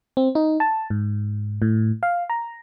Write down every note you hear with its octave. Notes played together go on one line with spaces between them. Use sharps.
C4
D#4
A5
G#2
A2
F5
A#5